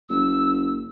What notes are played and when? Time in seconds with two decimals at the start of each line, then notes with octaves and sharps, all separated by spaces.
0.09 F#1 E6